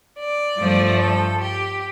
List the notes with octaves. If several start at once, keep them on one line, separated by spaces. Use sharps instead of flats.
D5
G2 F3 A3
A4
G4